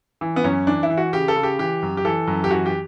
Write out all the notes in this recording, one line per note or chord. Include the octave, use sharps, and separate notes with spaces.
E3
B3
F#2 C#4
E3 D4
E4
E3
F#4
C#3 G4
A4
C#3
G4
E3 G4
F#2
G4
E3 A4
F#2
G4
E3 F#4
G4